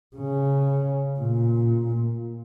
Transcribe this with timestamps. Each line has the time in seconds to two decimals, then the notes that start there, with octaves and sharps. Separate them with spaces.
0.16 C#3
1.20 A#2